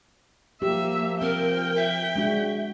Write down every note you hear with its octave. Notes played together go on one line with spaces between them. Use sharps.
F3 A#3 G4 E5
C4 A#4 G5
E5
G#3 D4 F#4